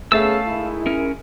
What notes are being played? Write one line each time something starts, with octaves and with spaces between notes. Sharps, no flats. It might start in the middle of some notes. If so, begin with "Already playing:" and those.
A3 B3 C#4 G#4 E5 F5 A5 E6
D#3 G#3 E4
C#4 A#4